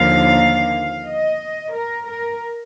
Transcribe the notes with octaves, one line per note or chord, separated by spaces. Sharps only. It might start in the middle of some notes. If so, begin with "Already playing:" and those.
Already playing: D#2 D3 F3 A#3 F5
D#5
A#4
A#4